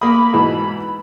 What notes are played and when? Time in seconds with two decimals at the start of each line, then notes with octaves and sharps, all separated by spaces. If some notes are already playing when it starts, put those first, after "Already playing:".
0.01 A#3 B5 D#6
0.33 G#2 B2 E3